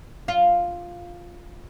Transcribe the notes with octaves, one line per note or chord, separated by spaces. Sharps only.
F4